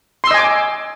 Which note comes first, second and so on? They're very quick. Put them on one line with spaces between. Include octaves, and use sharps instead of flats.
C6 E6 D#5 G#5 D6